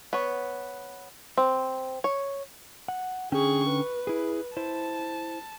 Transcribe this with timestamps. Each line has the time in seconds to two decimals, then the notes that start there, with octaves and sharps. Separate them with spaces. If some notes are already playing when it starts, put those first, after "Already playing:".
0.13 B3 C#5
1.38 C4
2.04 C#5
2.88 F#5
3.32 D3 C#4 G#4 G5 C#6
3.71 B4
4.07 E4 G#4
4.57 E4 C5 A5